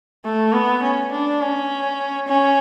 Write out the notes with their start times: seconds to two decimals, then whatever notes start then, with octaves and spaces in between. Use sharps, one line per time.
0.25 A3
0.53 B3
0.83 C#4
1.12 D4
1.41 C#4
2.28 C#4